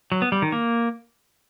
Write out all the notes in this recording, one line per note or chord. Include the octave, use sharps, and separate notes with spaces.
F#3
B3
G3
D#3
A#3